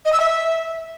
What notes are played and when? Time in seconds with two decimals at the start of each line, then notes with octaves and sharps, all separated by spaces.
0.05 D#5
0.13 E6
0.20 E5